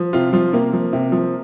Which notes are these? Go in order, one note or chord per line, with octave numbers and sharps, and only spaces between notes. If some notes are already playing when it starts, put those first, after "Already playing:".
Already playing: F3
C3 F4
F3 F4
C3 A#3
F3
C3
F3